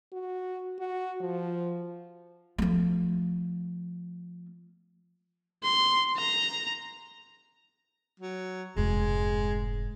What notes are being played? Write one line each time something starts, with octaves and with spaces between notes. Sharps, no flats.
F#4
F#4
F3
F3 A3
C6
A#5
F#3
F1 G#2 G#3